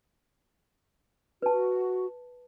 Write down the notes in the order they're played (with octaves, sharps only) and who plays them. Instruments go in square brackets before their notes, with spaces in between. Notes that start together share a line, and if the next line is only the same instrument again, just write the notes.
[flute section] F#4 [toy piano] B4 A5